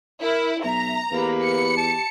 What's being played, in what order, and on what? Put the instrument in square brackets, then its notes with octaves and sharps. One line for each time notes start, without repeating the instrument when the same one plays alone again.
[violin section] E4 [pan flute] A#4
[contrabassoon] B1 [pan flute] E5 [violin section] A#5
[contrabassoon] E2 [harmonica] A#3 B4 [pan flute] G4
[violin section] C#7
[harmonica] A5